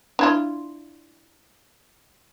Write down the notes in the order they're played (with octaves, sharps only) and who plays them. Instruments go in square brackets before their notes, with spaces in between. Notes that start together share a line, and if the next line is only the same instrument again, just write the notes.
[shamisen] D4 E4 F4